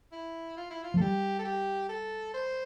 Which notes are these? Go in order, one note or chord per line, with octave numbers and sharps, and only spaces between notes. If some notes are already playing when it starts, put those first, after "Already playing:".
E4
F4
E4
F4
F3
A4
G3 G4
A4
G4
A4
C5